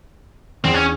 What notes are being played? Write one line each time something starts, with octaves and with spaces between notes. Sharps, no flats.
E2 C4
C#4